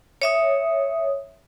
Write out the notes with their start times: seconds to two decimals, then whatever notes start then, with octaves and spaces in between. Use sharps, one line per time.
0.22 C#5 E5 D#6